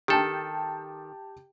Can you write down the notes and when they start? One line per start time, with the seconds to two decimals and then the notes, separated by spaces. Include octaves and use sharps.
0.08 D#3 G4 A4 G5 A5